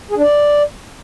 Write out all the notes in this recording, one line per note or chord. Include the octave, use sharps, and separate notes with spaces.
G#4
D4
D5